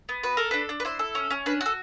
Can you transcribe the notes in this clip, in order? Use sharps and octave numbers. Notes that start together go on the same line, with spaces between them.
B3
F#4 B4
A4 A#4
D4 B4
D4
B4
E4 C5
A4
C#4
C#4
D4 B4
F#4
A4